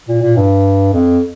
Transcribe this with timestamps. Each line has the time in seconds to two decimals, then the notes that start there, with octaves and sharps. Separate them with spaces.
0.08 A#2
0.22 A#2
0.36 G2
0.93 F2